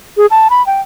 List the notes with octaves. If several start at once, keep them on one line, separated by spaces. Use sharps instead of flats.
G#4
A5
B5
G5